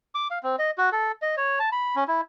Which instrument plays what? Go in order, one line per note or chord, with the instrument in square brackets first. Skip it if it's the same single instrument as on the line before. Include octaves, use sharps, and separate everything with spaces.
[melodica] D6
F5
C4
D#5
F#4
A4
D#5
C#5
A5
B5
C#4
E4